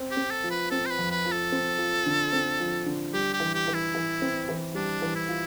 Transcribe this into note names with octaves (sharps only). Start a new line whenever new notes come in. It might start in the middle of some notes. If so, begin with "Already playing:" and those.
Already playing: C4
G4
C4
A4
F3
B4
C4 A4
C5
B4
F2
B4
F3
A4
C4
F3
D3
C4
F3
D3
G3 G4
G4
E3
G4
E3
E4
E3
C4
E3
G3 D4
E3
E4
F4